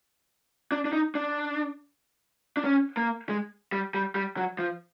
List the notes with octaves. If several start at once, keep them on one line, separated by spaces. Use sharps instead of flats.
D4
D4
D#4
D4
D4
C#4
A#3
G#3
G3
G3
G3
F#3
F3